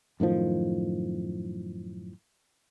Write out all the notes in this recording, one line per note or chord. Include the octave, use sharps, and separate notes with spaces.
F#2 A2 D#3 F3